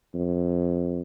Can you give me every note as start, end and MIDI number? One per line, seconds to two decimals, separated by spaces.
0.14 1.02 41